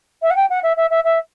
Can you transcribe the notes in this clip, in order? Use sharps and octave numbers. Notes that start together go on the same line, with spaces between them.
E5
F#5
G5
F#5
E5
E5
E5
E5